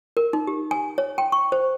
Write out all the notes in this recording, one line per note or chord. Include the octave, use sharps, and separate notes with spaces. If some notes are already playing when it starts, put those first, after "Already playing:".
A#4
D#4
G4
G#5
C#5
G5
C#6
C5